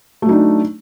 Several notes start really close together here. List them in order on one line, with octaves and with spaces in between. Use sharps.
A3 F#3 D#4 D4